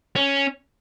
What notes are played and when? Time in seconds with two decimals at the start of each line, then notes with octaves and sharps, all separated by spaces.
0.16 C#4